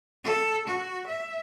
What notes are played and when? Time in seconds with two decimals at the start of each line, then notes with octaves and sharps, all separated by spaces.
0.24 A4
0.67 F#4
1.06 E5